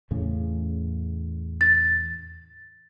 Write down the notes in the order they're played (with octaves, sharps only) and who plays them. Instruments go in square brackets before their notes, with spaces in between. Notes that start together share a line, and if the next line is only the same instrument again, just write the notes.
[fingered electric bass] E2 A2 C#3
[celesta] A6